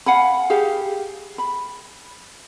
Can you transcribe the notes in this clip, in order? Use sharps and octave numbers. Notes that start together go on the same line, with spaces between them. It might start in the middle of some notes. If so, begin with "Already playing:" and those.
F5 F#5 G#5 B5
G4 G#4 F5
B5